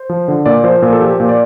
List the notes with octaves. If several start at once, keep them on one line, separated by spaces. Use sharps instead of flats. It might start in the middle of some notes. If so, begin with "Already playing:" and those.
Already playing: C5
F3
D3
A#2 D5
F3 C5
A#2
A4
F3 G4
A#2
D5